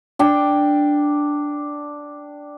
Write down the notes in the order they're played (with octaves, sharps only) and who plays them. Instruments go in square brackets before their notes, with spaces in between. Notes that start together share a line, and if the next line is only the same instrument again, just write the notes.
[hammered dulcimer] D4 G5